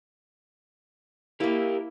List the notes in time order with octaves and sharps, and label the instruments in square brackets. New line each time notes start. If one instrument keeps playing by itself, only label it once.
[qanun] A#3 E4 [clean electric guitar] G4 A#4 F5